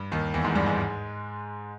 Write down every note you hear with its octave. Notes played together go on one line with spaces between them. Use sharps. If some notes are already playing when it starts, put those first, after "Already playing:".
Already playing: G2
D#2 D#3
E2 E3
G#2 G#3
G2 G3
G#2 G#3